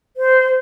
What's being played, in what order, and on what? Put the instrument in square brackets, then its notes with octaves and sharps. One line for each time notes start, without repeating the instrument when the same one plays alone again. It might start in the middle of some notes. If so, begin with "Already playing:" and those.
[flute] C5